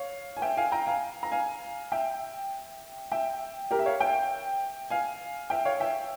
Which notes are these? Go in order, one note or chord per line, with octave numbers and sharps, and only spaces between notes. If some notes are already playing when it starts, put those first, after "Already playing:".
Already playing: C#5 F5
G#5
E5 G5
F5 G#5
G5 A#5
F5 G#5
A#5
F5 G#5
E5 G5
E5 G5
G4 A#4
E5
C#5 F5
E5 G5
F5 G#5
E5 G5
C#5 F5
E5 G5